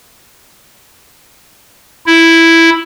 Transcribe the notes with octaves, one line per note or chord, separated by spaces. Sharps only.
E4